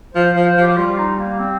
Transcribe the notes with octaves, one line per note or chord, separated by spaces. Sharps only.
F3 C5
F3
C5
F3
G4
F3
G3 F4
D#4
A#3
C4